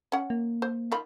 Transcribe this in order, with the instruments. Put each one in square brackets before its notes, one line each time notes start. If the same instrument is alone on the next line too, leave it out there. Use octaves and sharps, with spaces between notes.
[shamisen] C#4 F#5
[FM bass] A#3
[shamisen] C5
D#3 F4 B5